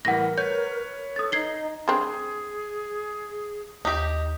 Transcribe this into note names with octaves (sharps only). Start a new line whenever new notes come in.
A2 E3 G3 A#4 F#5 A#6
B4 C#5 G6
A4 D#6 A6
D#4 G#6 C7 G7
G3 C4 D4 G#4 G5
D#2 D#4 G4